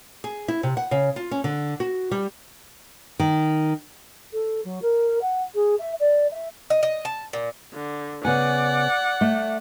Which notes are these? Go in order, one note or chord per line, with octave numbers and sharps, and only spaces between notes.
G#4
E4
C3
F#5
C#3
F4
C#4
D3
F#4
G3
D#3
A4
F#3
A#4
F#5
G#4
E5
D5
E5
D#5
D#5
A5
A#2
D3
C#3 B3 D5 F#5 G#5
A3